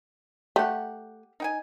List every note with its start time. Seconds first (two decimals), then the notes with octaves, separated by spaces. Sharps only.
0.56 A3 G4 F#5
1.40 D#4 G5 G#5